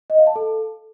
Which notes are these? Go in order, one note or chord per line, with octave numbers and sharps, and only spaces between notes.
D#5
F5
A5
A4